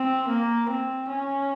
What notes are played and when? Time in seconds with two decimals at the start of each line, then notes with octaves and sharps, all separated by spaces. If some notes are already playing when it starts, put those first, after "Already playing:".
Already playing: C4
0.28 A#3
0.69 C4
1.09 C#4